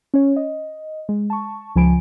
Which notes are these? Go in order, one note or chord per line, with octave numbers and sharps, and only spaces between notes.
C#4 C#5
D#5
G#3
A5 C#6
C#2 F3 G#5 B5 D7